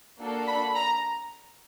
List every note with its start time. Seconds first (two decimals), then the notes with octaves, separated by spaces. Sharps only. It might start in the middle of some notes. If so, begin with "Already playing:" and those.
0.20 A#3 D4 F#4 A4
0.47 B5
0.75 A#5